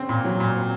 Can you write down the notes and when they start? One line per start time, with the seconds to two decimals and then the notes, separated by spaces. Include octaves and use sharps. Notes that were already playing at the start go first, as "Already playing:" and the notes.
Already playing: C#3 C4
0.09 A#2
0.25 F#3
0.40 A#2
0.55 C4